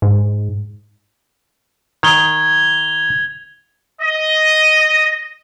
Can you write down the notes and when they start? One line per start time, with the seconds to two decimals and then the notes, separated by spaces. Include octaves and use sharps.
0.02 G#2
2.03 D#3 G#6 F7 G7
4.01 D#5